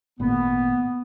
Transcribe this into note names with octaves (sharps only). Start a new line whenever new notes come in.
G#1 A#2 B3